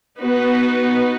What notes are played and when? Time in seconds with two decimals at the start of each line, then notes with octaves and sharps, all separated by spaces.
0.19 B3 D#4 F#4 B4